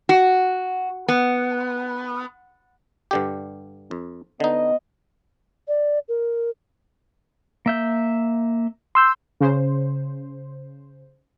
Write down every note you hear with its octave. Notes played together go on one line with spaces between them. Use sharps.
F#4
B3
G2 D3 G4
F2
D3 B3 D#4 D#5
D5
A#4
A#3 E5 G6
C6 E6 G6
C#3 C5